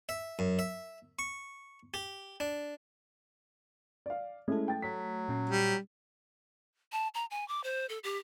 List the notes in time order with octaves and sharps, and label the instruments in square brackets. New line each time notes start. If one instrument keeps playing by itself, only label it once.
[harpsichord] E5
F#2
E5
C#6
G4
D4
[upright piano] D5 F5
[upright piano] G#3 C#4 E4 [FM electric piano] A3 A4
[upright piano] G5 A6
[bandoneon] F#3 [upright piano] B6
[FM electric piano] A#2 C#4
[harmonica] G3
[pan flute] A5
A#5
G#5
D6
C5
A4
G4